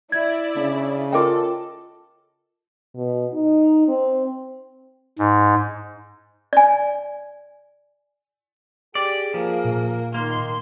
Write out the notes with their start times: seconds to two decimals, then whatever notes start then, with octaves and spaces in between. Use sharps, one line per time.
0.12 E4 D5 G#6
0.57 C#3 D4
1.12 F4 A4 A#4 D#5 G5 D6
2.96 B2
3.33 D#4
3.88 C4
5.19 G#2
6.53 D5 G#5
8.95 G4 G#4 D5
9.34 F3 A#3
9.65 A#2
10.14 D#3 A#3 C6